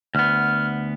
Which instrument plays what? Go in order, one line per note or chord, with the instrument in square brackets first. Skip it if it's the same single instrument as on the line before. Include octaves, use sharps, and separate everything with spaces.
[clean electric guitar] D2 B3 [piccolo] F6